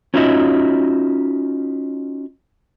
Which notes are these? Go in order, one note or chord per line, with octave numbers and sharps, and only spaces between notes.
C#4 D#4 F4 F#4 D#5 E5